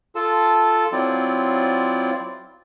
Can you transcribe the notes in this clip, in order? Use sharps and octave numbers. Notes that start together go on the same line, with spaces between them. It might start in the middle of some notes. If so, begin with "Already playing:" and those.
F4 A4 A5
F#3 C4 E4 F4 D5